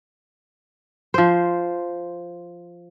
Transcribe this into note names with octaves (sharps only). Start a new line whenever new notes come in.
F3 C5